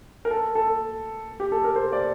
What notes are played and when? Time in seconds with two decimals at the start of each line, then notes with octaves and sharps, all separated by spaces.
0.25 A#4
0.31 A4
0.55 A4
1.40 G4
1.52 A4
1.64 A#4
1.76 C5
1.93 D5